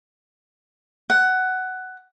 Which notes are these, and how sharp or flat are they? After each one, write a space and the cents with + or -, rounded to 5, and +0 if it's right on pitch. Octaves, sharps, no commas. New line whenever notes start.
F#5 +10